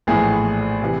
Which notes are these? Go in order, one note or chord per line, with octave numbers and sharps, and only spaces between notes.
A#1 A2 E3 G#4
C3 E3